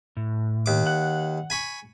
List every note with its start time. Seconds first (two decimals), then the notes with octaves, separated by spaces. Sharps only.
0.17 A2
0.66 D#2 D6
0.87 F#5
1.50 G#5 B5 C#6